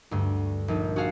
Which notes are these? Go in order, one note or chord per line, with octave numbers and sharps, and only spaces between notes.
D2 G2
A#1 D#4
F#4 G#4 A4 F5 F#5